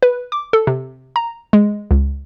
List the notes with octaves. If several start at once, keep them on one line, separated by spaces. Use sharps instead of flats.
B4
D6
A4
C3
A#5
G#3
C#2